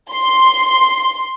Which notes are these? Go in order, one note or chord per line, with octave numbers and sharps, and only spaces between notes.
C6